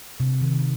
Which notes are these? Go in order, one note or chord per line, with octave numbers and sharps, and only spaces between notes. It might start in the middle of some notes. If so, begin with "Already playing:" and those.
C3
D#3